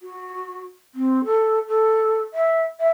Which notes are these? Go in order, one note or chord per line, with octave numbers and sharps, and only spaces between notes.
F#4
C4
A4
A4
E5
E5